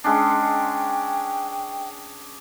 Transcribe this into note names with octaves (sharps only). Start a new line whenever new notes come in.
G#3 C#4 D4 G5